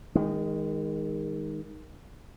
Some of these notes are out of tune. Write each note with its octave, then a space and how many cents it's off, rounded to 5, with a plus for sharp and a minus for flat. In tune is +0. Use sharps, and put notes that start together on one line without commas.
D#3 +0 G#3 -30